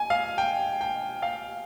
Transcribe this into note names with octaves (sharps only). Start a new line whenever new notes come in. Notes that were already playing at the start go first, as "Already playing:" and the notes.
Already playing: G#5
F5
G5
G5
F5